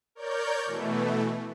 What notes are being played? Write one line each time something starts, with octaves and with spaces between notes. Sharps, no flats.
A#4 C#5 D5 G6
B2 E3 A3